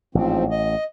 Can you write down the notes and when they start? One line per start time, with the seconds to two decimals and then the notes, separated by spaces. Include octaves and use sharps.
0.15 A1 G#2 F3 C4
0.51 D#5